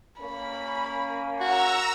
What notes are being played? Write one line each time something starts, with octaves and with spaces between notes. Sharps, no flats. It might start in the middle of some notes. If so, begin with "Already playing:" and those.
A#3 C#4 B5
F#4 F#5 A#5 E6